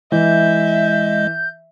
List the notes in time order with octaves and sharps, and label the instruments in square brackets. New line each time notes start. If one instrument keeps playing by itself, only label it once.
[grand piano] E3 [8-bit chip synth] G#3 D#5 [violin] E5 [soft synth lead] G6